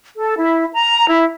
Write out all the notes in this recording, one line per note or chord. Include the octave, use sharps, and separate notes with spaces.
A4
E4
A#5
E4